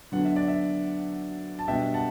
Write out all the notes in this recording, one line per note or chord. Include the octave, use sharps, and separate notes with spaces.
D3 F#3 B3 D4 F#5
E5
D5
E5
A5
B2 G3 B3 D4 E5 G5
F#5 A5